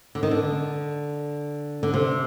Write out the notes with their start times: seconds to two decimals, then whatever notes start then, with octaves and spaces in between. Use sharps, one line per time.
0.15 D3
0.23 D#3
0.31 D3
1.83 D3
1.94 C3